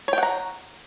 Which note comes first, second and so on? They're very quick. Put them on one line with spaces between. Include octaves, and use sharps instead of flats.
C#5 G5 F#5 A#5